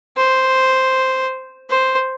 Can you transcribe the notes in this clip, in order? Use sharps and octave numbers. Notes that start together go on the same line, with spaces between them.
C5
C5